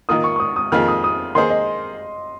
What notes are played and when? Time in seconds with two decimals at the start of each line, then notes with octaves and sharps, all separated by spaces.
0.09 D#3 A#3 F4 D#6
0.24 C#6
0.36 C#6
0.40 D#6
0.56 D#6
0.72 F2 D#3 A#3 F4 G#4 F6
0.88 D#6
1.04 D#6
1.35 D#3 A#3 D#4 G#4 C5 C6
1.50 D#5